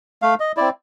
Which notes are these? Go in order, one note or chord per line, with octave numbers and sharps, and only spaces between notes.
A3 F5
D#5
C4 E4 D5